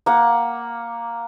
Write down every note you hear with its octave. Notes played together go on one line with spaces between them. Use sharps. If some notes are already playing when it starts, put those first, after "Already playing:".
A#3 F#5